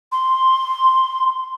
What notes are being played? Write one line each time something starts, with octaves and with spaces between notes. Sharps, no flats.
C6